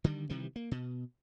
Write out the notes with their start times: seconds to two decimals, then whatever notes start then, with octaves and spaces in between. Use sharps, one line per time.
0.04 D3 D#3 G3
0.29 C3 D#3 E3 G3
0.56 A#3
0.71 B2